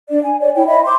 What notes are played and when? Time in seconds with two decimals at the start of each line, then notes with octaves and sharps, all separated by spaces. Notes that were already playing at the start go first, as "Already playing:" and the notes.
0.09 D4 D5
0.23 G#5
0.40 C#5 D5
0.54 E4 C#5 G5
0.67 C#5 D#5 E5 B5
0.85 C5 C6 D6